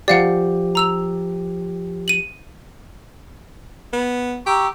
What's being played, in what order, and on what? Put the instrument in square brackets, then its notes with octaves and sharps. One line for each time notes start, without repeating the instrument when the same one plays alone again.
[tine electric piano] F3 G4 [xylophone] D5 F5 F#5
[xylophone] A#5 E6 F7
D#7 F#7
[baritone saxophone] B3
[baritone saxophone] G4 [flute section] A#5 C#6 E6